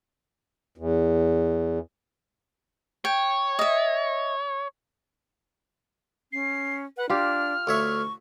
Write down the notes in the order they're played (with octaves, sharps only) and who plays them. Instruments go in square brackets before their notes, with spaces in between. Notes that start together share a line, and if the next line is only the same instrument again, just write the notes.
[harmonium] E2
[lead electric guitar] C#5 [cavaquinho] G5
[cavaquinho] D#5 E5
[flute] C#4 [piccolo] C7
[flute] B4 [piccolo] F#5
[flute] D4 [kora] F4 G4 [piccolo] F6
[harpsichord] D2 C#5 E5 [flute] C#6